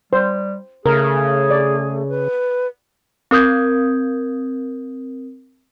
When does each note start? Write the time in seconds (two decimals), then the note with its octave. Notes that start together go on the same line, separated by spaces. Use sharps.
0.13 G3 C5
0.86 C#3 A3 G#4 A#4
1.51 D5
2.08 B4
3.31 C4 A#4 D#6 G6 G#6